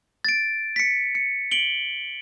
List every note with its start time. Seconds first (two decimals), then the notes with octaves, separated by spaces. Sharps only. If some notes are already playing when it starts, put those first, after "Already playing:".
0.25 A6 D7
0.76 B6 C#7
1.15 C#7
1.51 D7 F#7 G7